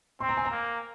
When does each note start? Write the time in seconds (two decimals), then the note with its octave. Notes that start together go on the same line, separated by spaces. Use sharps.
0.20 C4 C6
0.29 A#5
0.37 G#5
0.45 A#5
0.51 A#3